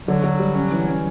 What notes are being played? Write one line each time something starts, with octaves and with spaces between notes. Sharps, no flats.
D3 F#3
D3
G3
C#4
E3
C#4